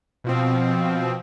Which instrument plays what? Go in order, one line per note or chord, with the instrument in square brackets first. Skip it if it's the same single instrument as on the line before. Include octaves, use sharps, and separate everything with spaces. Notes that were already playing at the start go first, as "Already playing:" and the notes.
[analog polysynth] B2 F3 C4